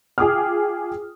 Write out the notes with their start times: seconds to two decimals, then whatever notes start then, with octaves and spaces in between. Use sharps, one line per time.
0.18 F4 G#4 G5 D6 D#6 F6